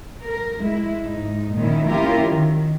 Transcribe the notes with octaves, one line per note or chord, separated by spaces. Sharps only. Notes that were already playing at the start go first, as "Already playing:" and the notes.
A#4
G#3 E4
G#2 D#4
A#2 D#3 C#4 E4
A#3 C#4 E4 F4 G4 A#4
D#3